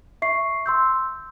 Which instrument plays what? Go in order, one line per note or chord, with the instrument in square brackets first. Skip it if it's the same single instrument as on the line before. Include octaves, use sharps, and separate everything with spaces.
[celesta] E5 C#6 C7
C6 E6 G6